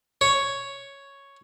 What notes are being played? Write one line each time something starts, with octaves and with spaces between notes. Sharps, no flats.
C#5